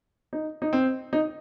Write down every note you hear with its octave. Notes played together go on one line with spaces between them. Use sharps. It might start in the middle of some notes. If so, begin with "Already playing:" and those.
D#4
D#4
C4
D#4